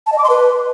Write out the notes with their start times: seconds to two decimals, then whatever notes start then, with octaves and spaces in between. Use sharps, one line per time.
0.07 A5
0.12 D#5
0.18 D6
0.24 C6
0.30 B4